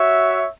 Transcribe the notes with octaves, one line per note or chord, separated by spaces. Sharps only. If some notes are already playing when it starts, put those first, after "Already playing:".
Already playing: F#4 C#5 E5